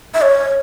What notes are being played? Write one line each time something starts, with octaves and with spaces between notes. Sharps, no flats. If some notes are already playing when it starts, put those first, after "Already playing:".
E5
C#5